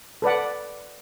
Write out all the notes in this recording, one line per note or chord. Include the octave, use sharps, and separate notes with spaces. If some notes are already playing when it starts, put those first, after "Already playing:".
A4 B4 D5 F#5